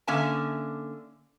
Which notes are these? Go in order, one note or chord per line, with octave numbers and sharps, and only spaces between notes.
D3 A#3 C#4 E5 G#5 A5